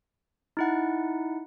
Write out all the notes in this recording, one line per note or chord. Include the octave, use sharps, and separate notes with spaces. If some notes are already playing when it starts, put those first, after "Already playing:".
D#4 E4 F#5